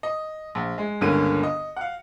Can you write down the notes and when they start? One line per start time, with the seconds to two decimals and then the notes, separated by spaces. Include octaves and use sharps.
0.03 D#5
0.55 A#1
0.78 G#3
1.01 G1 C#2 D3 A#3 C#4 D#7
1.43 D#5
1.76 F5 F#5